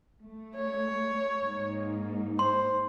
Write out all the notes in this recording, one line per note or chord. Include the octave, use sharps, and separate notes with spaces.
A3
C#5
G#2 A#3 D#4
C5 C6